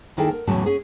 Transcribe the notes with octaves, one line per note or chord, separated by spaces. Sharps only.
D#2 D#3 E4 G#4 A4 G5
A#4
E2 A2 C#3 E3 F#3 A5
C#4 G#4